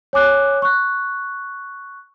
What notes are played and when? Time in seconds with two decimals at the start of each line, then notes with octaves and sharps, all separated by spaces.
0.13 C#5 G#5 D6 F#6
0.62 C#6 F#6